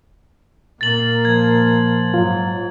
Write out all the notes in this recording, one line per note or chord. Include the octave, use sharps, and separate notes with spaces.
A#2 A#3 A6 F#7
F3 G#6
G#2 F#3 F4